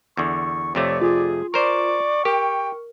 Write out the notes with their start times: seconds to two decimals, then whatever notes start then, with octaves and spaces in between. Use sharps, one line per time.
0.17 E2 D3 C#6
0.75 F2 C3 A3 C#5 D5
1.02 F4 G#4
1.54 A#4 C5 D5 C#6
2.25 G4 A#4 G5